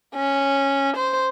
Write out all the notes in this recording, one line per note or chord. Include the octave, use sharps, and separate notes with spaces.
C#4
C5